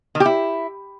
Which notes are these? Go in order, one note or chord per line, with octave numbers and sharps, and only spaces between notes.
D#3
G4
E4